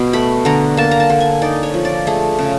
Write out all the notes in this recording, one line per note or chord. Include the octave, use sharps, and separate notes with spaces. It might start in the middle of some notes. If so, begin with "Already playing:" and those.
Already playing: B2
A3 B5
D3 A#5
A#3 A5
A#5
A5
D3
G#5
D#4 D5
C#5
F3
D5
A3 G#4
C#3